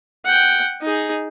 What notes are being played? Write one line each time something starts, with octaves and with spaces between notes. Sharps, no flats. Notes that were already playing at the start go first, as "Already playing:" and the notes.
F#5 G5
D#4 G#4